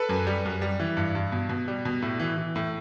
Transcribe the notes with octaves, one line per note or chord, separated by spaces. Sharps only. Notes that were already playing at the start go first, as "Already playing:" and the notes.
Already playing: A4 B4
F#2
G3
F#2
G3
E3
G2
G2
B2
B2
G3
B2
A2
E3
E3
A2